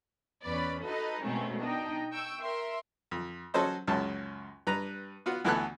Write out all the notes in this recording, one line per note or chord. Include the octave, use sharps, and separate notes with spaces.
E2 C#4 B4 D5 B5
D#4 F#4 A4 B4 D#5
B2 D#3 G#3 A3 C4 C#4
D4 D#4 D#5 G5
G5 C#6 E6
A#4 E5 C6
F2
F#3 C#4 A4 C5 D#5
C#2 F#2 C#3 A5
G2 B4 A#5
B3 F4 F#4
D2 E3 B3 A4 G#5 F#6